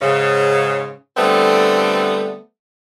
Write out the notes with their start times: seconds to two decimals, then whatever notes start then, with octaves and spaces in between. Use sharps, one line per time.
0.01 G#2 C#3
1.17 D3 G3 A3 B3 C4